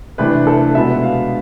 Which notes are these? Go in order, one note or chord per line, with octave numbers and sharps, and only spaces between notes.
C3 E3 A3 D4 B4
A4
B2 G#3 B3 D4 E5
F5